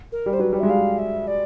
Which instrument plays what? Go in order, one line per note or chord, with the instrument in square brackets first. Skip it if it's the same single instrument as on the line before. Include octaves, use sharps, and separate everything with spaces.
[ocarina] A#4
[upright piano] G3
[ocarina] C5
[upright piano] F#3 [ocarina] B4
[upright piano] G3
[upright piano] G#3 [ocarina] E5
[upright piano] G3 [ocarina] F5
[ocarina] E5
D5